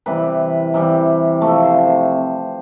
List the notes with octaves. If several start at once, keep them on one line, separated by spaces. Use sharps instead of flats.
C3 E3 G3 B4
C3 E3 G3
C3 F3 A3
C5
C5